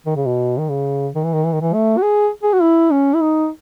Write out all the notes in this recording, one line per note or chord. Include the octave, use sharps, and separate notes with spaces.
D#3
C#3
B2
D#3
C#3
D#3
E3
D#3
E3
D#3
E3
A3
F#4
G#4
G#4
F#4
E4
C#4
E4
D#4